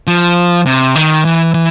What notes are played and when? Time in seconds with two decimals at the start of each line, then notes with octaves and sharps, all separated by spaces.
0.07 F3
0.66 C3
0.96 D#3
1.25 E3
1.54 E3